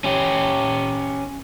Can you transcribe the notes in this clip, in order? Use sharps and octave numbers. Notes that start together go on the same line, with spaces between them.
C#4 G4